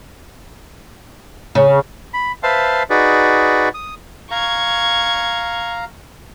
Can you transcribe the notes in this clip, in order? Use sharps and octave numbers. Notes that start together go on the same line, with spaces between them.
C#3
B5
B4 C5 E5 F5 A5 C6
D#4 F#4 G#4 B4 D5
D#6
F5 A#5 C#6 G#6